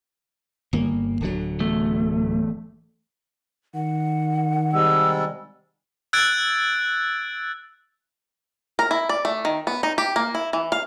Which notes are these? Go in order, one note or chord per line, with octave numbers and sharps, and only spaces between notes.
G1 A#3
D1 D3 F#3
E2 A3
D#3 F#5
C3 G3 G#3 E6
E6 F#6 G#6 A6 D7
A#4
E4
D5
A3
D#3
B3
D#4
G4
A#3
E4
E3
F5